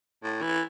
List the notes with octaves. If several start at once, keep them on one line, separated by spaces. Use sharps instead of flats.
A2
E3